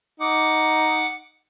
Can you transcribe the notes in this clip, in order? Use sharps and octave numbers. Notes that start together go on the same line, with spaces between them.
D#4 F#5 D6